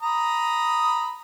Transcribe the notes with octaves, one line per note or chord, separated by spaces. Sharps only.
A#5 B5 D#6